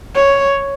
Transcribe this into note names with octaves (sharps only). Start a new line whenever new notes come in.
C#5